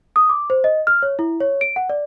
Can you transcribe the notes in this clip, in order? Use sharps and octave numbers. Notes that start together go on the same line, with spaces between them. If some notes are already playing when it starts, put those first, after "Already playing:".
D#6
D6
C5
D#5
F6
C#5
E4
C#5
D7
F#5
D5